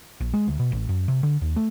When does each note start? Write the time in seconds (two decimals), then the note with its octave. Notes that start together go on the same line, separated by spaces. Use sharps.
0.21 A#1
0.34 G#3
0.48 D2
0.59 B2
0.72 A1
0.89 F#2
1.08 C3
1.23 D3
1.42 D#2
1.56 A3